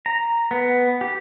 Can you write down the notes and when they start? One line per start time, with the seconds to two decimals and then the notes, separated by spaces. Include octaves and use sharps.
0.06 A#5
0.51 B3
1.01 G4